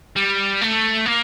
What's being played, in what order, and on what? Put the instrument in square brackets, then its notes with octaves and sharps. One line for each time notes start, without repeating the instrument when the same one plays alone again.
[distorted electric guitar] G3
A3
A#3